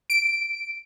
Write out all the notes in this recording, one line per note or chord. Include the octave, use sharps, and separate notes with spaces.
D7